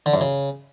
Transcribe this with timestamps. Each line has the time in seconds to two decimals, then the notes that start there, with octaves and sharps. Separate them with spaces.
0.06 D3
0.14 F#2
0.21 C#3